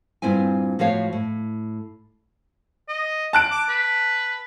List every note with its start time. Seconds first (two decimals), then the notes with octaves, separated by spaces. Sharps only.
0.22 G2 A#2 C4 E4 G#5
0.79 A2 F3 F#4 C5 C#5 F5
1.13 A2
2.88 D#5
3.33 A5 F#6 D7
3.51 D6
3.69 B4